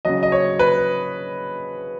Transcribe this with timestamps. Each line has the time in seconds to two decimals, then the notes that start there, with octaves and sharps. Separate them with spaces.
0.05 C#3 F#3 D#5
0.23 D#5
0.32 C#5
0.59 B4